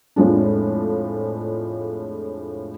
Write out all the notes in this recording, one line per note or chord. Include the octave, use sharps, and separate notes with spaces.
F2 A2 F3 G#3 D4